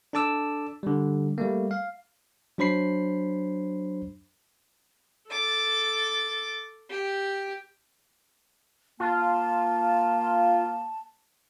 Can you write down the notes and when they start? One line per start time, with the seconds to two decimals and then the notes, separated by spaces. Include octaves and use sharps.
0.13 D4 A4 A5 D6 E6
0.83 D3 G3
1.38 G3 A3 A#3
1.71 F5
2.58 F#3 D4 C5 B5 C7
5.29 A4 D6 A6
6.89 G4
9.00 A#3 F4 A5